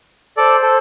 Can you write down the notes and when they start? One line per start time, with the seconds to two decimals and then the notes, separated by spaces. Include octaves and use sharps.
0.37 A4 C5 D5
0.62 A4